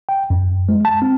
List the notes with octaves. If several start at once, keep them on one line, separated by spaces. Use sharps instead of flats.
G5
F#2
G#3
A5
C4